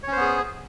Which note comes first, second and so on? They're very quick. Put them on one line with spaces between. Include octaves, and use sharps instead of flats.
C#5 C#4 C5 B3 G#4